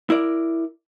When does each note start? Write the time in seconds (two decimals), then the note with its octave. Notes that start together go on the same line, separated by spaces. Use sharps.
0.10 E4 A#4 D5